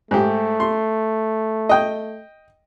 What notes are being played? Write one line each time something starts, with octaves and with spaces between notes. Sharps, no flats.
G#2 A3 G4
C6
D#5 G5